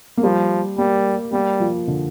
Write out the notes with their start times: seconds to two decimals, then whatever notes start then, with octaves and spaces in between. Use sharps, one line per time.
0.17 A#3
0.23 F3 G3
0.78 G3 A#3
1.32 G3 A#3
1.60 F3
1.88 D3